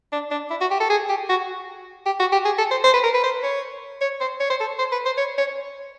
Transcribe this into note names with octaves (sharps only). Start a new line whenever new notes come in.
D4
D4
E4
F#4
G4
A4
G#4
G4
F#4
G4
F#4
G4
G#4
A4
C5
C5
B4
A#4
B4
C5
C#5
C#5
C5
C#5
C5
A4
C5
B4
C5
C#5
C#5